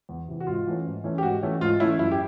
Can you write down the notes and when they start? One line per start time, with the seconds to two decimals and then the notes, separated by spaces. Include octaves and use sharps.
0.09 E2
0.28 C3 E3
0.40 F#4
0.47 G#2 F4
0.67 E3 A3 C#4
0.86 G#2
1.04 E3 A3 C#4
1.18 G4
1.23 G#2 F#4
1.43 E3 A3 C#4
1.61 G#2 F4
1.80 E3 A3 C#4 E4
1.99 F#2 E4
2.11 G4